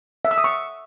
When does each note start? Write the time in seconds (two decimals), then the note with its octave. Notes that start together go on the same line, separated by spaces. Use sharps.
0.25 E5
0.31 E6
0.38 D#6
0.44 C#6